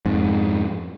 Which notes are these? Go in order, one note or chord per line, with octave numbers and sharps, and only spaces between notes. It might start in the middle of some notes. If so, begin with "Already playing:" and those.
F2 G#2